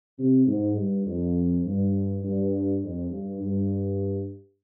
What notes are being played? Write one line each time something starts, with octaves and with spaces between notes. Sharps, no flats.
C3
G#2
G2
F2
G2
G2
F2
G2
G2